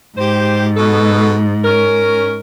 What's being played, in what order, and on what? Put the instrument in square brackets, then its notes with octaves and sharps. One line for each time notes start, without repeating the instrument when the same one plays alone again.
[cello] G#2 [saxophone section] G4 C5
[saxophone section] B2 A4
C#4 A#4